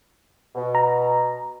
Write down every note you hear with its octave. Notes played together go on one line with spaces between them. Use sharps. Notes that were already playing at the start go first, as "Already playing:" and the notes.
B2
A#5